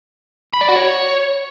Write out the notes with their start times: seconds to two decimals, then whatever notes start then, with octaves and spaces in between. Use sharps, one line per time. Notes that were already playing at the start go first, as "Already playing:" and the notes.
0.54 B5
0.61 D5
0.69 F#4
0.76 C#5